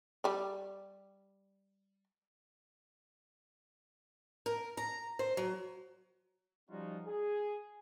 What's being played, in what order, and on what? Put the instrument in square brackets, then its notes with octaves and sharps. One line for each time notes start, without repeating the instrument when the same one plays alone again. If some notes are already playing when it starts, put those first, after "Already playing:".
[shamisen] G3 D5
[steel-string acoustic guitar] A#4
A#5
C5
F#3
[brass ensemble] F3 G3 C#4 D#4 F4 F#4
G#4